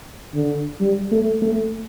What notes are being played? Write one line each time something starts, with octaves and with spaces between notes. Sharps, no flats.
D3
G3
A3
A3